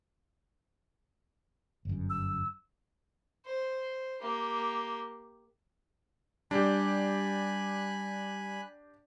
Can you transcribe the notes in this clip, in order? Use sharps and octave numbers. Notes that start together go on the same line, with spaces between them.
G1 F#2
E6
C5
A#3 G4
G3 D4 G4 G#5 B5 F#6